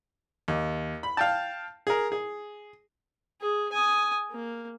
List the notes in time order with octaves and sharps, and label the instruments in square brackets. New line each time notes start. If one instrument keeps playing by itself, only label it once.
[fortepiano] D#2
B5
F5 G5 A5
G#4 A#4
G#4
[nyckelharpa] G#4
G#5 D#6
A#3